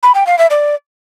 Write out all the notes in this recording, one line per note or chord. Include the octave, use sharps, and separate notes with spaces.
B5
G5
F5
E5
D5